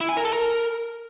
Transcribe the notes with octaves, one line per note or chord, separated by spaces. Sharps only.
E4
G#5
A#4
A4
A#4